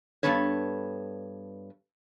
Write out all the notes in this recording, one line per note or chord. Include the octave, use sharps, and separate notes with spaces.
G2 D#3 B3 A4 B4 C#5